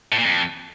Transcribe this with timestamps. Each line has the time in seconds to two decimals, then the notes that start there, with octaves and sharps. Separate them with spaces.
0.12 A2
0.19 A#2
0.25 F2